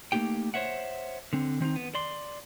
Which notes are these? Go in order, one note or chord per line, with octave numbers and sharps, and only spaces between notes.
A3 A#3 C#4 D#4 G4 G5
C5 C#5 E5 F#5
D3 C4
D#3 C4 D4 D#4
B3
D5 C6